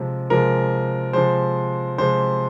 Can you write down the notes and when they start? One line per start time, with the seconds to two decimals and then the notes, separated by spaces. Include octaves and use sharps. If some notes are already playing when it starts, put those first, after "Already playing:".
Already playing: C3 F3 G#3
0.30 C3 F3 G#3 A#4
1.13 C3 F3 G#3 C5
1.98 C3 F3 G#3 C5